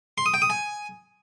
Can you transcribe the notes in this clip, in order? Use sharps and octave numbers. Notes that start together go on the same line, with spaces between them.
C6
D#6
G5
D#6
G#5